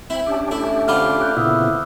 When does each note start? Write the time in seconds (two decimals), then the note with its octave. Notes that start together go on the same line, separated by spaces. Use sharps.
0.10 C4 E4 B5
0.26 C#4 D4 G4
0.51 A3 E4
0.88 D3 C4 F4 B5 D6 F6
1.22 F#6 G6
1.37 A#2 C#3 B3 E4 D#6 E6